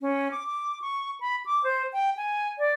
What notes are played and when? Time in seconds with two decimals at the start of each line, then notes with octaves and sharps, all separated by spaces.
0.01 C#4
0.31 D6
0.47 D6
0.82 C#6
1.21 B5
1.46 D6
1.64 C5
1.93 G5
2.17 G#5
2.59 D5